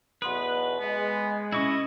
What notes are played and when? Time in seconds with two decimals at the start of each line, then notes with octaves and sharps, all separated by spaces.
0.22 B1 E2 B2 B4 F#5 C6 D#6
0.80 G#3 B3
1.53 B2 C#4 E4 D#5 C#6